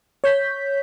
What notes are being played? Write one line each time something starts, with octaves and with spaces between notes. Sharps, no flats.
C#5 G6 B6